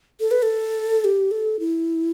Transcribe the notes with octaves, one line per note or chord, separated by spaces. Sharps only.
A4
B4
A4
G4
A4
E4